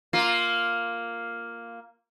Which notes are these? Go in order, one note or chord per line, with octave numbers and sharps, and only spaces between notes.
A#3 F4